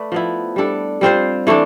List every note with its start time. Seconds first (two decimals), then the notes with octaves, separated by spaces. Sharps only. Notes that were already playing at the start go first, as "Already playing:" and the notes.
Already playing: A3 B4 D5
0.12 F3 B3 E4
0.56 G3 D4 A4
1.01 G3 C4 F4 C5
1.47 E3 A3 D4